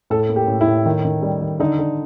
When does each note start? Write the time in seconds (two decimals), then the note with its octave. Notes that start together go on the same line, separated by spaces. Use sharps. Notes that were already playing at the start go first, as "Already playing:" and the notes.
0.10 A2 A4
0.29 A#3
0.36 G4
0.48 A2
0.61 E4
0.67 A2
0.86 D#3
1.05 D#3
1.22 G3
1.41 D#3
1.60 D3 D#4
1.79 D3